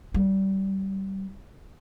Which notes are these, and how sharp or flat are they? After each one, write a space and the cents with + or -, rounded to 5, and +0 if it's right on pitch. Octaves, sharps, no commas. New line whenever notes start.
G3 -25